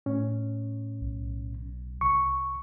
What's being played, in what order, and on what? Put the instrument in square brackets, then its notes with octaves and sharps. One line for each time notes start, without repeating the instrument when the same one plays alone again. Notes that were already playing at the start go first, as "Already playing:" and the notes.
[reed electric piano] A2 C#4
[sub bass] B1
[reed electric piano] C2 C#6